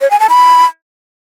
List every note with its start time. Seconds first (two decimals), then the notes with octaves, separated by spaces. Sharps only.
0.01 C#5
0.11 G#5
0.20 A5
0.29 B5